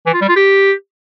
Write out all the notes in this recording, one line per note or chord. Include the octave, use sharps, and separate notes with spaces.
E3
F4
G3
F4
G4